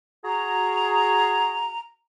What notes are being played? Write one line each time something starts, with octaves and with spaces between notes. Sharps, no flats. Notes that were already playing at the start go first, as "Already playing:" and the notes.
F#4 G#4 A#5